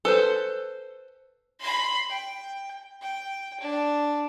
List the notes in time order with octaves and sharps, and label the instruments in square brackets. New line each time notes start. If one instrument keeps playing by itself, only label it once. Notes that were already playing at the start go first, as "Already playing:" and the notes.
[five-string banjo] A4 B4 C5
[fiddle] B5 C6
G5
G5
D4